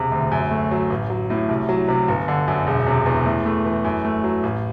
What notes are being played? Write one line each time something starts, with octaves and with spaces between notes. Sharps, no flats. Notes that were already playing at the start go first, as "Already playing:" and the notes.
Already playing: E1 C3
D2
F#2
A3
F#3
A1
F#3
A2
C2
F#3
C3
G1
D3
F#2
E1
C3
E2
A2
A3
E3
F#2
A3
F#3
A1